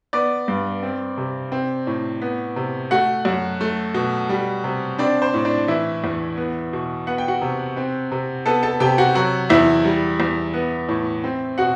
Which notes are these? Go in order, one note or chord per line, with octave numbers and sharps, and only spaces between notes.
B3 D5 D6
G2
C4
C3
C4
A2
B3
C3
A3 F#4 F#5
F#2
A3
B2
G3
C3
C4 D4 D5
C5
A2
D4 D5
E3 E4 E5
E2
B3
B2
B3 F#5
G5
F#4 F#5
C3
C4
C3
B3 A4 A5
A4 A5
C3 G4 G5
F#4 F#5
F#3 F#4 F#5
E2 E4 E5
G3
E2
B3
A2
C4
B2 F#4 F#5